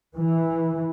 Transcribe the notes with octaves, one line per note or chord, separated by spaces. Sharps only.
E3